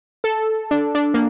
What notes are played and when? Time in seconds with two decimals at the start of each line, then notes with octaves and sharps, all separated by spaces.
0.24 A4
0.71 D4
0.95 D4
1.14 A#3